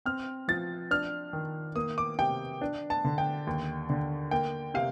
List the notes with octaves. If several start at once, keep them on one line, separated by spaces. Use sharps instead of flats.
C4 F6
F3 A6
D4 F6
D#3
A#3 D#6
D6
C3 G5
D4
A5
D3
G5
D#2
D3
A#3 G5
C3 F5